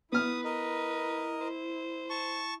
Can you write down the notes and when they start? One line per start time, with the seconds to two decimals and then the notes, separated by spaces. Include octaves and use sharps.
0.12 B3 E4 B4 D#6 F6
0.44 A#4 D#5
1.41 C5
2.10 A5 C#6